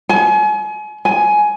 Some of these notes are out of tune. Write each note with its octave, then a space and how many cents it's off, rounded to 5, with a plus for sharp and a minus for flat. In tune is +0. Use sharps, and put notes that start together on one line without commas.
G#5 +35
G#5 +15